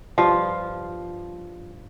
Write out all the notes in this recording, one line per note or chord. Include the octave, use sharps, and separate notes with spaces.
G2 F3 F4